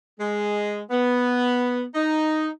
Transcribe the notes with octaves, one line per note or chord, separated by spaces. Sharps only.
G#3
B3
D#4